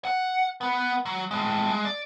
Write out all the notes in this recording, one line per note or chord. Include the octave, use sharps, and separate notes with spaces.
F#5
B3 B4
F#3
A2 G#3
G#3
D5